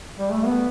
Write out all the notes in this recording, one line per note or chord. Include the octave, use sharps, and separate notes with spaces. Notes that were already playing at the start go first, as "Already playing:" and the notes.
G3
A3
B3